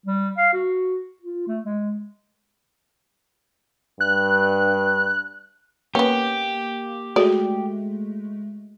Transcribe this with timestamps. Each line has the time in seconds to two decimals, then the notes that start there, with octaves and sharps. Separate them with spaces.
0.06 G3
0.38 F5
0.53 F#4
1.22 F4
1.47 A3
1.64 G#3
4.00 G2 F#6
5.95 A#3 B3 C#4 G4
7.16 G#3 A3 F#4 D5